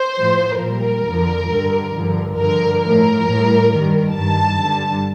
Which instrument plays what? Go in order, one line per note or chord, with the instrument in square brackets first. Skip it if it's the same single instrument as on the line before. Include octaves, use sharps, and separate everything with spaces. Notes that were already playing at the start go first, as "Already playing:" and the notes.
Already playing: [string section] C5
A2 F3
A#2 G3 A#4
F2 D3 F3
G2 D3 G3
G2 D3 F3
G2 D3 F3 A#4
A2 F3 A#4
A2 G3
G2 D#3 G3
G2 D#3 G3 A5
G2 D3 G3